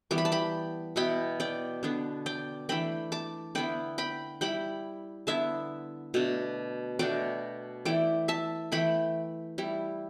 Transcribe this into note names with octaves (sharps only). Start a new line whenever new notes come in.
E3 G3 B3 D6
B5
A5
G5 B5
B2 B3 E4 G5 B5
D5 G5
D3 B3 D4
D5 G5
E3 A3 D4 G5 B5
A5 D6
D3 B3 E4 G5 B5
G5 B5
G3 E4 G5 B5
D3 B3 E4 E5 A5
B2 A3 D4
B2 A3 D4 D5 G5
E3 A3 E4 D5 G5
E5 A5
E3 A3 E4 G5 B5
G3 E4